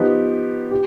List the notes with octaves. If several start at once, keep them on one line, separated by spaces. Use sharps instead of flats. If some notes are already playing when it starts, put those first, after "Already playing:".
Already playing: F3 B3 D#4 G4 B4
G4